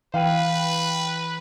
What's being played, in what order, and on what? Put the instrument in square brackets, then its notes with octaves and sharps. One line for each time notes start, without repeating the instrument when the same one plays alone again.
[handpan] E3 [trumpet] B4 [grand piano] F5 G5 D#7